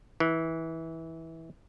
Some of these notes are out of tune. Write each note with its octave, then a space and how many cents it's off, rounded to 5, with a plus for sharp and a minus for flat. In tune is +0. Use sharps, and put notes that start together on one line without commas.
E3 -20